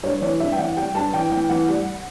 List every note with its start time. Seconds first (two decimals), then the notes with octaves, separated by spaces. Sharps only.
0.03 G2 C#5
0.21 E3 C#5
0.40 G2 E5
0.52 G5
0.58 E3 F#5
0.77 G3 G5
0.95 G2 A5
1.14 E3 G5
1.32 E3 G5
1.50 E3 F#5
1.69 G3